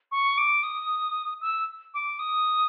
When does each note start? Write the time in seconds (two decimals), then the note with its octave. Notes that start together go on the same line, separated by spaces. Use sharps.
0.12 C#6
0.38 D6
0.63 D#6
1.41 E6
1.94 D6
2.19 D#6